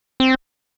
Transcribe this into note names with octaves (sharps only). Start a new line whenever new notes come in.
C4